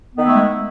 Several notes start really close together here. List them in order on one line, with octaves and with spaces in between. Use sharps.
B3 D#3 E4 A3 G#3